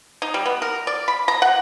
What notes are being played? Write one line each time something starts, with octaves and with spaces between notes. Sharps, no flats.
D#4
G3
B3
A#4
D5
B5
A#5
F#5